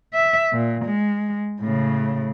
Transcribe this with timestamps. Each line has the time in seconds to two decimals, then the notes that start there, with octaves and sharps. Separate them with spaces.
0.14 E5
0.53 A#2
0.85 G#3
1.61 A2 C#3